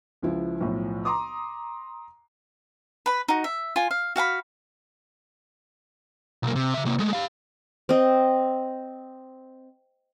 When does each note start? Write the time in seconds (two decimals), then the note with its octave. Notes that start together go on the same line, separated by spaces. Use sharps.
0.22 C#2 F3 E4
0.61 B1 A2 F3
1.05 A#5 C6 D6 D#6
3.06 B4 B5
3.28 D#4 F#4
3.44 E5
3.76 F4 G#5
3.91 F5
4.16 F#4 F5 G5 B5
6.43 B1 A#3
6.56 C3
6.74 C#3 E5
6.85 C3 A#3
6.99 G#3 A3
7.13 G4 F5
7.89 C4 D#5